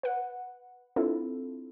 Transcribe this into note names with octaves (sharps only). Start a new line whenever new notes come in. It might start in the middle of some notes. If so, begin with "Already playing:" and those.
B4 F#5
C4 D4 E4 F4 A4